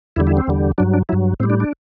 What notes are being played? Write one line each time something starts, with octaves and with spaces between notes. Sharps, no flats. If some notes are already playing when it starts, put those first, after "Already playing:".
E2 D3 G3 E4
E4
C4
E2 D3 G3
G2 F#3 D4
D4
G2 F#3 E4
A2 G3 C4
D4
D4